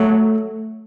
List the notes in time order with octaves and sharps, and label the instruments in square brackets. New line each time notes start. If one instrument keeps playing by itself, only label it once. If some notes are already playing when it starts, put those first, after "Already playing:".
Already playing: [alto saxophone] F#3 [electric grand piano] A3